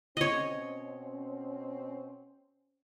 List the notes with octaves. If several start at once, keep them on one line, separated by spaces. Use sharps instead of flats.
B2 C4 C#4 C#5 D#5